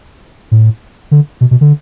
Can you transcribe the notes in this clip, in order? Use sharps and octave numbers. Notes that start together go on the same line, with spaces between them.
A2
D3
B2
B2
D3